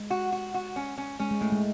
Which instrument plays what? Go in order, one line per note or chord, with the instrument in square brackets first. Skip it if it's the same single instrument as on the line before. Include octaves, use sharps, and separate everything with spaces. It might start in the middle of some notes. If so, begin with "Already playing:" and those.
Already playing: [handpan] G#3
[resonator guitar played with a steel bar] F#4
F#4
F#4
C#4
C#4
[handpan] G#3 [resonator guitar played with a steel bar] C#4
[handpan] G#3
[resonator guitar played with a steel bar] A2 [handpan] A3
[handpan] G#3